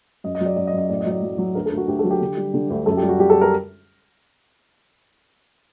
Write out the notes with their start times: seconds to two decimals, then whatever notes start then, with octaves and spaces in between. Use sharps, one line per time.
0.24 F#2 D#5
0.35 D#5
0.41 F#3
0.46 D5
0.56 F#2 D5
0.67 D#5
0.73 F#2
0.78 D#5
0.89 A2 D5
1.00 D#5
1.06 F#3
1.11 D5
1.23 F#3
1.38 F#3
1.55 D2 A#4
1.66 A4
1.72 D2
1.77 F#4
1.88 D2 G4
1.99 A4
2.04 F#3
2.11 G4
2.21 D3
2.37 G3
2.54 D3
2.70 D2
2.86 F#2 A4
2.97 G4
3.03 G3
3.08 F#4
3.19 G3 G4
3.30 A4
3.41 A#4